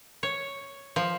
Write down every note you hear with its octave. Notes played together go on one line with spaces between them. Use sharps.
C#5
F3